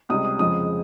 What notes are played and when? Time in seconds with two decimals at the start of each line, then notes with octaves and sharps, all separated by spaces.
0.09 C#2 C3 G3 D#6
0.25 D#6
0.39 F2 C#3 F3 G#3 D#6